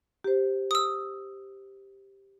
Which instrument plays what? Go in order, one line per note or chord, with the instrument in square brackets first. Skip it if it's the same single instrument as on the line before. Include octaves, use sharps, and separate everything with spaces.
[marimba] G4 C5
[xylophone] D#6 E6